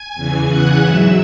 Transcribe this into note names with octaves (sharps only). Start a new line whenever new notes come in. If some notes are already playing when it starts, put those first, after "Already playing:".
Already playing: G#5 G#6
E2 C#3 E3
F#5 F#6
G#2 F#3 E5 E6